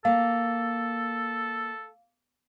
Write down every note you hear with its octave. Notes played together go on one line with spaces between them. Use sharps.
A#3 A4 F5